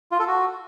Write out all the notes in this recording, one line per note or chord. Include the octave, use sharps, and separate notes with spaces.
F4
A4
F#4